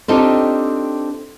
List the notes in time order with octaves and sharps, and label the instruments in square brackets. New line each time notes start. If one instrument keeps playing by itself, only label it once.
[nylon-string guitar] C4 D4 D#4 F4 G4 A4